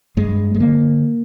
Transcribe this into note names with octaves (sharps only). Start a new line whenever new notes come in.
G2 G#3
G#3
D3 A#3